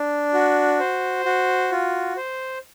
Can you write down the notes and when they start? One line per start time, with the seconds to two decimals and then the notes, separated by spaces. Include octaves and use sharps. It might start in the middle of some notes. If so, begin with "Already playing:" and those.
Already playing: D4
0.34 F#4
0.79 C5
1.25 F#4
1.71 F4
2.17 C5